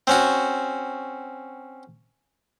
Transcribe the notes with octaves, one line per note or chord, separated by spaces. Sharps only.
C4 C#4 F#4